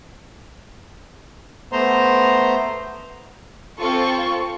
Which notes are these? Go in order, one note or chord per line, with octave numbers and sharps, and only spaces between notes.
A3 B3 C5 A#5 C6
C4 F4 A4 C#6